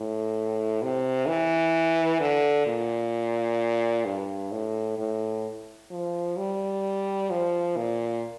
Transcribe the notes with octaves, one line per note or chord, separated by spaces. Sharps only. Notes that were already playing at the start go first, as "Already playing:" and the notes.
Already playing: A2
C3
E3
D3
A#2
G2
A2
A2
F3
G3
F3
A#2